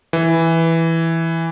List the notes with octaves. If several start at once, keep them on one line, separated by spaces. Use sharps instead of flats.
E3